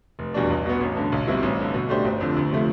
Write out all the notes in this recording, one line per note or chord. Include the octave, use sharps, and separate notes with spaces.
F1
E2 B2 G3 D4
B1
B2 B3
A1
G2 D3
B1
B2 G3 C4 E4
A1
G2 D3
B2
A3 D4 G4 C5
G1
F2 D3
D2
C3 F3 A3